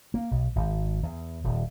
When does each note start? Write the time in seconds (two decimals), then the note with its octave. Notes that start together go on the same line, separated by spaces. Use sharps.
0.14 A#3
0.31 B1
0.56 G#1
1.03 E2
1.44 D#1